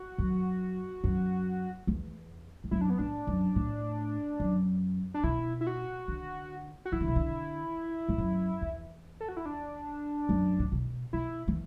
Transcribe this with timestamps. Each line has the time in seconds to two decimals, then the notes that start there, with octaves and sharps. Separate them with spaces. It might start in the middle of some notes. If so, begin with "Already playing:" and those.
Already playing: F#4
0.18 F#2
1.04 F#2
1.87 E2
2.64 A2
2.71 F#2 E4
2.81 D4
2.90 B3
2.98 A2 D4
3.27 F#2
3.56 A2
4.40 F#2
5.14 D4
5.24 B2 E4
5.61 E4
5.67 F#4
6.08 D3
6.85 F#4
6.92 E3 E4
7.00 D3
7.08 B2
7.16 D3
8.09 A2
8.18 F#2
8.61 E2
9.21 A4
9.29 F#4
9.37 E4
9.46 D4
10.29 F#2
10.59 A2
10.72 B2
11.13 B2 E4
11.48 E3